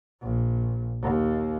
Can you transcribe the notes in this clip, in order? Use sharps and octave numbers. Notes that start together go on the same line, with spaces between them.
A#1
D#2